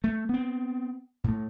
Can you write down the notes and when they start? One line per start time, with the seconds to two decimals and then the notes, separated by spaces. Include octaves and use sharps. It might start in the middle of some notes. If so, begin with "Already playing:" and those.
0.04 A3
0.29 B3 C4
1.24 A2 A3